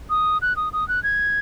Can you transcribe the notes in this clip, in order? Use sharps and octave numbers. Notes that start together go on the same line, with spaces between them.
D#6
F#6
D#6
D#6
F#6
G#6